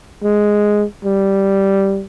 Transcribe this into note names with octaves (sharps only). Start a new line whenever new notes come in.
G#3
G3